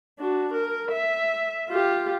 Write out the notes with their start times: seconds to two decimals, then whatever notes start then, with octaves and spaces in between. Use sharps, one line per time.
0.19 D4 F#4
0.53 A#4
0.91 E5
1.69 F4 G4